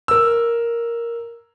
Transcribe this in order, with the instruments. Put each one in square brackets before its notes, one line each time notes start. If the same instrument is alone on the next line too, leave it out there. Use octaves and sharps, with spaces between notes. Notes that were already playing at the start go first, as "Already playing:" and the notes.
[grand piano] A#4 E6